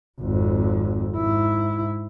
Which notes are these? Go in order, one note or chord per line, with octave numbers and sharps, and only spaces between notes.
G#1 F2
G#2 E4